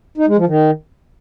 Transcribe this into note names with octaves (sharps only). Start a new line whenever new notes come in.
D#4
G#3
F3
D#3